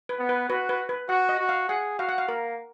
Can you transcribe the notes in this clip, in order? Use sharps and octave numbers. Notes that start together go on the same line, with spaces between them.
B4
B3
B4
F#4 B4
B4
B4
F#4 F#5
D#5
F#4
F5
G#4 F#5
F#4 F5
F#5
F5
A#3 A#4